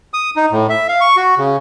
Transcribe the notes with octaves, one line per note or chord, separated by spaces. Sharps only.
D#6
D#4
A2
E5
F5
C#6
F#4
C#3